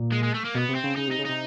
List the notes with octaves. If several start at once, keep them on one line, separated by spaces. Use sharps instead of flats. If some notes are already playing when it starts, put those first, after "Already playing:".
Already playing: A#2
G#3
G#3
A3
A#3
B2 B3
C3
C4
C#3
C#3 D#4
C3
D#4
C#3
C3 D#4